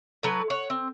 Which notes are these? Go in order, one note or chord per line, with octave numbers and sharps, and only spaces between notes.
A2 F#3 B4
C#5 F#5
C4